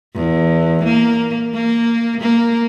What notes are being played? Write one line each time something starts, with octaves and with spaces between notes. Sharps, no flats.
E2
A#3
A#3
A#3